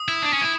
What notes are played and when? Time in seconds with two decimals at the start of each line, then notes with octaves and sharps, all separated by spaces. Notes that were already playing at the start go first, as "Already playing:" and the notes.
Already playing: D#6
0.08 E4
0.22 D4
0.33 C#4
0.41 E4